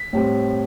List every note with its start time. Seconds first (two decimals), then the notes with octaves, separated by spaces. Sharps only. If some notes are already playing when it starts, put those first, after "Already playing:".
Already playing: B6
0.13 A2 G3 C4